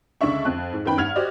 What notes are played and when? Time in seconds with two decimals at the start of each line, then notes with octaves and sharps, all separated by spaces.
0.21 C#2 D3 D4 E5 C#6
0.45 F2 F#6
0.73 G#2
0.85 F#2 D#3 B3 G5 B5
0.97 G2 F#5 F6 G#6 F7
1.16 F#4 G4 C5 D5 D#5